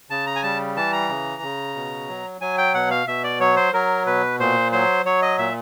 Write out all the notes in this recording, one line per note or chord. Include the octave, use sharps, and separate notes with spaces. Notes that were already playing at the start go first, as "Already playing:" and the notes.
C#3 A5
A#5
G#5
G3 A5
E3 A5
A#5
C#3
C#3
B2
F#3
F#3 G#5
G5
B2 F#5
F5
B2 E5
D5
F#3 C#5
C5
F#3 A#4
B2 B4
A#2 C5
F#3 C5
F#3 C#5
D#5
A#2 E5